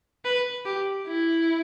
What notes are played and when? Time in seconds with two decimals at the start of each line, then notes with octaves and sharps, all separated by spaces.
0.25 B4
0.66 G4
1.08 E4